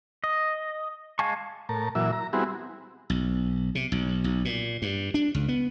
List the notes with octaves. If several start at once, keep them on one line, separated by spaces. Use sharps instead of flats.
D#5
G#3 F5 G#5 A5 C#6
A2 A#4 A5
A#2 E3 F#3 E5
A#5
G3 B3 C4 E4 F#4 G#4
B1
C3
B1
B1
A#2
G2
D4
C#2
B3